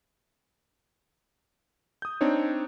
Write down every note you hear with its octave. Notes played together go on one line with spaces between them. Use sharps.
D#6 G6
C4 D4 D#4 C#5